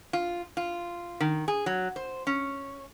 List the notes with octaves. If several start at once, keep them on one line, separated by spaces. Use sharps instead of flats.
F4
F4
D#3
G#4
F#3
C5
C#4